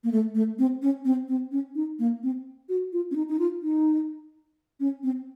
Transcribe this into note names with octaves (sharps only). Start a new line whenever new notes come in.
A#3
A3
A3
C4
C#4
C4
C4
C#4
D#4
A#3
C4
F#4
F4
C#4
D#4
D#4
F4
D#4
C#4
C4